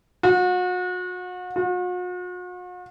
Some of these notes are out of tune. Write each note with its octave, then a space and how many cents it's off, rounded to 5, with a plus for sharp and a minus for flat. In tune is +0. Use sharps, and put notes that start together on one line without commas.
F#4 -35
F#4 -45